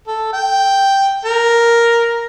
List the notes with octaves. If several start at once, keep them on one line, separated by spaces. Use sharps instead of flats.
A4
G5
A#4